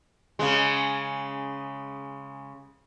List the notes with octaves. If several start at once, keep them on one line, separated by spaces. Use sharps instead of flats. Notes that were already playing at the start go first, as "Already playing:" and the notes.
C#3 G#3